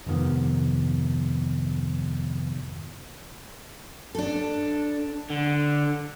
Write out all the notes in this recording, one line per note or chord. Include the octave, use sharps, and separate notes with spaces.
F2 G#2 C3 D#3 F3 B3
D4 A4
D3